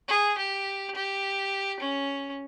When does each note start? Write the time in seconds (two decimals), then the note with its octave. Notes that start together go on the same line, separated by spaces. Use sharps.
0.09 G#4
0.38 G4
0.95 G4
1.80 C#4